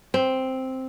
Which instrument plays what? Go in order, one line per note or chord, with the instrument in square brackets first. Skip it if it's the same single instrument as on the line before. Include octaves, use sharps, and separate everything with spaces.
[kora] C4